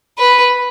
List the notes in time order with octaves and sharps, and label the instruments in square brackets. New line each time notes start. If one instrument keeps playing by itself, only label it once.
[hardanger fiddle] B4